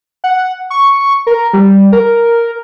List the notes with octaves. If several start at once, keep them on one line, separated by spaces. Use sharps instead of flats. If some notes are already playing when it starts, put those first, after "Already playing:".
F#5
C#6
A#4
G3
A#4